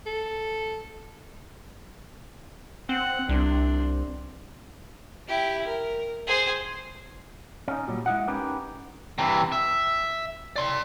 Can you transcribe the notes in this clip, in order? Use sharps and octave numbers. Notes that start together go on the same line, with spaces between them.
A4
C4 F#5
C2 C4 D4
E4 G4
A#4
G#4 C5
C#4 D#4
A#2 F#3 G3
G#3 E4 D#5 F#5
C#4 D#4 G4 A#4 B4
C3 E3
E5
D5 C6